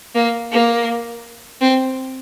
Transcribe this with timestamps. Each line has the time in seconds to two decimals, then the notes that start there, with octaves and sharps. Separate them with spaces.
0.15 A#3
0.52 A#3
1.61 C4